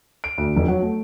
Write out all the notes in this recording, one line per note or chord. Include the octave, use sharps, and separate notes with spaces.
D7
D2
F1
F#3
A3